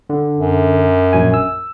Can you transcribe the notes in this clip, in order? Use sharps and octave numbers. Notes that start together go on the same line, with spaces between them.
D3
F#2
A#1 F#3 G#5
E6